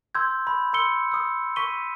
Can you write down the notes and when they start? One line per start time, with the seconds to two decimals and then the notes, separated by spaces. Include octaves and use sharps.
0.15 C6 E6 G6 G#6
0.47 B5
0.73 C6 E6 C#7 G7
1.12 D#6 E6
1.56 C#6 B6 D#7 G7